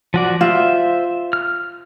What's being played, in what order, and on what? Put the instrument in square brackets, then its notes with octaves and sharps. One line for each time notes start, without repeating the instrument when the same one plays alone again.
[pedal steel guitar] F3 F#4 D5
[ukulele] F4 [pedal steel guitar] C5 E5
[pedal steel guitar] F6